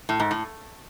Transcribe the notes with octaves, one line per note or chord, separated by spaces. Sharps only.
A2
G#2
A2